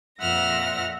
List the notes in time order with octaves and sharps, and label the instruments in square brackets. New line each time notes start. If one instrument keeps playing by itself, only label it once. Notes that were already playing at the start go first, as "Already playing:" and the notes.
[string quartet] F2 A#2 E5 F#5 F6 A#6